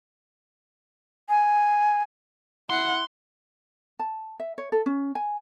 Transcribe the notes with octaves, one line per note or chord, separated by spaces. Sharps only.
G#5
E4 F#5 C6
A5
E5
C#5
A4
C#4
G#5